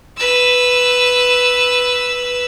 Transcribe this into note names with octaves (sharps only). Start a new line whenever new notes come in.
B4 E6